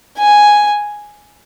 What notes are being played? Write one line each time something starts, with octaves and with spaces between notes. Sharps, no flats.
G#5